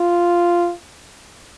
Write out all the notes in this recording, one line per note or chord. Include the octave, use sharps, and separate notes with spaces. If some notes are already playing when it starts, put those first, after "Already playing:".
Already playing: F4